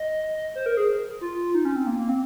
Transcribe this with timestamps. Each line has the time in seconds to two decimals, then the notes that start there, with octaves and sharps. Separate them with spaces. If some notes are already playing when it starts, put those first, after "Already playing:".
Already playing: D#5
0.55 C5
0.66 A#4
0.77 G#4
1.21 F4
1.54 D#4
1.65 C#4
1.76 C4
1.87 A#3
1.98 A#3
2.09 C4